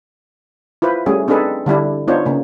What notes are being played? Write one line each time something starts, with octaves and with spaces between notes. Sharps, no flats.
E4 F4 B4 C5
G3 A3 C#4 G#4
C4 D4 D#4 G#4 A4 B4
D3 G3 D4 E4
B3 D4 D#4 F4 C5 C#5
C#3 A#3